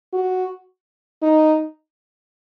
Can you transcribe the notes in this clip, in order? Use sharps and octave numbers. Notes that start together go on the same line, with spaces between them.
F#4
D#4